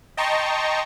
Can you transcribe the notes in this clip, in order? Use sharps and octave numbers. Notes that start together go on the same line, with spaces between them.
D#5 G5 A5 A#5 C6 C#6